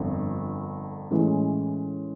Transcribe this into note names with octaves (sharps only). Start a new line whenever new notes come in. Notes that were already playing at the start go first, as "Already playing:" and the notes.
Already playing: G1 F2 D3
A2 E3 G#3 C#4